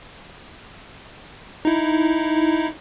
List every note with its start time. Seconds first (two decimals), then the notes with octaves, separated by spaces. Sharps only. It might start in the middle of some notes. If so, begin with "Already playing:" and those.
1.65 D#4 E4